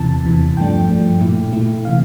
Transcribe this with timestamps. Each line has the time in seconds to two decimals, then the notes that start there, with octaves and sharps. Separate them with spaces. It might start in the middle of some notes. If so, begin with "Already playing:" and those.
Already playing: E2 C3 E3 A5
0.24 E2 C3 E3
0.57 G2 F3 A3 D4 G5
0.89 G2 F3 A3 D4
1.21 A#2 A3 E4
1.53 A#2 A3 E4
1.85 C3 E3 F5